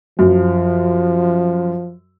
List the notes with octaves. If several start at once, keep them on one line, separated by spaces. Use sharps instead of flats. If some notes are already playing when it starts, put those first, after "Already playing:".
F#2 F3